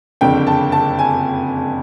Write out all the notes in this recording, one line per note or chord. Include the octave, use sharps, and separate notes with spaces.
F#1 F2 D3 G5
A5
A5
G#5